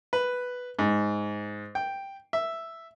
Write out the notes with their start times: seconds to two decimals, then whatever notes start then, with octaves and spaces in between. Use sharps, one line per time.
0.13 B4
0.79 G#2
1.75 G5
2.33 E5